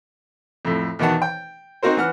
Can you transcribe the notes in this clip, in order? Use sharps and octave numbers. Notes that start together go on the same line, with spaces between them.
F2 A2
E2 B2 D#3 F#5 A5
G5
C4 D#4 F#4 A#4 C5
E3 F#5 F6